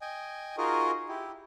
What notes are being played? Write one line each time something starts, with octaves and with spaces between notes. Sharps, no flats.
D#5 G5 G#5
D#4 F4 F#4 G#4 A#4 D#5
E4 G4